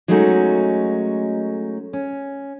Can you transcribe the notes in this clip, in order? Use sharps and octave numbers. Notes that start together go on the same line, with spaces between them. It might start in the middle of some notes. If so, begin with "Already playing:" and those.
F#3 G#3 A3 C#4 D#4 F#4
C#4